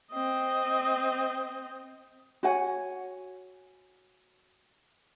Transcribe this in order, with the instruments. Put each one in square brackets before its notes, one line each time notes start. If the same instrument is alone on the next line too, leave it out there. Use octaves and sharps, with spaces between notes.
[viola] C4 D#5
[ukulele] F#4 C#5 F#5 G#5